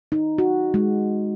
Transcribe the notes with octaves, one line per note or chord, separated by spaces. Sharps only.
D#4
F#4
G#3